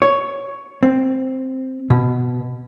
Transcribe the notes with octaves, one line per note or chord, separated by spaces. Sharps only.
C#5
C4
B2